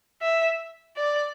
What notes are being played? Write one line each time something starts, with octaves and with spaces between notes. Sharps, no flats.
E5
D5